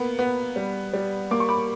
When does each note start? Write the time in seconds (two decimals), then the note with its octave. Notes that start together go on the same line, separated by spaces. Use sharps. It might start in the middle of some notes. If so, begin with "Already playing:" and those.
Already playing: A#3 B3
0.19 B3
0.56 G3
0.93 G3
1.31 A#3 D6
1.40 C#6
1.49 B5 D6